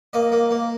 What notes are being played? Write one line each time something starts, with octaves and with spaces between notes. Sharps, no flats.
A#3 D#5
A#3
A#3